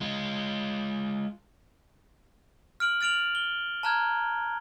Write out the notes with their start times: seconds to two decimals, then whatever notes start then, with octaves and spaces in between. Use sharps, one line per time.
0.01 G#3 F4
2.80 F6 D7 F#7
3.01 F6 A6 D7 F7 F#7
3.35 G7
3.83 A5 A#5 F6 F#6 G#6